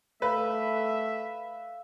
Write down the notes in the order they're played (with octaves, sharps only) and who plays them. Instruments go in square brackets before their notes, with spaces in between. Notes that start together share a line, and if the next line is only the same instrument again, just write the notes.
[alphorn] A3 [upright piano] B4 [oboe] E5 [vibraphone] F5